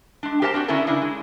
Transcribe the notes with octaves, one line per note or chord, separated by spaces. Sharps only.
G#3 D4
G4 A#4 C5 F5 A5
C4 D4 F#4
D3 C#4 E4 A4 A#4
C#3 D4 E4
G#3